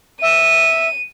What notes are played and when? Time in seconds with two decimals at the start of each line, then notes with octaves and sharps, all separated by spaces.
0.22 E5 D#7